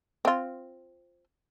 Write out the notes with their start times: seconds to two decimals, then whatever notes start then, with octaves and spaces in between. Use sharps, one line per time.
0.25 C4 F4